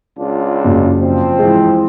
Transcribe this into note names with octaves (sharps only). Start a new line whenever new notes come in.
C#2 D4 F4
F#1
F3 C4
E3 G#3